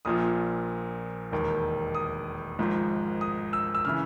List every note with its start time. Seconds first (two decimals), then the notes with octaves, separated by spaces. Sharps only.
0.05 A#1 A#2 F3 D#6
1.32 E1 D#2 D#3
1.95 D#6
2.59 G#1 G#2 F3
3.21 D#6
3.53 E6
3.75 E6
3.85 C#3 E3 F6